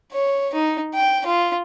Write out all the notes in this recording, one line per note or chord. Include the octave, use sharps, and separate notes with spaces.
C#5
D#4
G5
F4